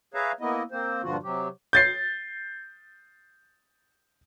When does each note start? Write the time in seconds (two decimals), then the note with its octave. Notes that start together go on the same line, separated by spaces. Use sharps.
0.14 G#4 B4 C#5 E5 F5 A#5
0.41 A#3 B3 E4 D#5
0.71 A#3 C4 C5
1.03 G2 A#2 D3 F3 F4 F#4
1.23 C3 F#3 G4
1.73 G6 A6 C7